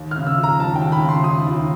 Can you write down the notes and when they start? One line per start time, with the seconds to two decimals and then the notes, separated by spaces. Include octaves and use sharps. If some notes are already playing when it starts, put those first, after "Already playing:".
Already playing: D#2
0.11 F6
0.17 C#3
0.27 E6
0.37 F3
0.43 A#5
0.60 D#2 A5
0.76 G5
0.82 D#2
0.92 B5
1.03 C#3
1.09 C6
1.24 F3 D#6
1.47 D#2